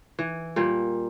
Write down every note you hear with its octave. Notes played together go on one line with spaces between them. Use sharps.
E3
A#2 G3 A#3